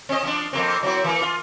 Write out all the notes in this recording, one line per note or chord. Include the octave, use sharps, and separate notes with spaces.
C4 D#5
F3 D4
F2 A#3 C4
F#3 C4 E4
E3 A#3
F4